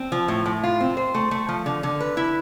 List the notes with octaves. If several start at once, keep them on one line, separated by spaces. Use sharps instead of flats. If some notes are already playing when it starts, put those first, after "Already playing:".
Already playing: C4
F3
A2
A2
F4
C4
C5
A3
A3
F3
D3
D3
B4
E4